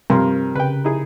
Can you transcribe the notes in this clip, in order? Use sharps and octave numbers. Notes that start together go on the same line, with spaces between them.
G2 C3 F3 A#4 C6
C#3 B4 G5
D#4 E4 G#4